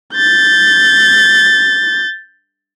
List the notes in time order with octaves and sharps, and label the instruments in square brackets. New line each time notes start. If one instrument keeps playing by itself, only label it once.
[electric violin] G6 A6